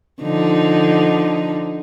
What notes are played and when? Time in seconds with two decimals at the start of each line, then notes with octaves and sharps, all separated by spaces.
0.22 D3 F3 D#4